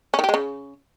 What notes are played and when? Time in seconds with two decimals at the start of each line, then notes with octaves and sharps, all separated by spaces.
0.14 C#4
0.19 D#3
0.24 G4
0.29 G#3
0.34 C#3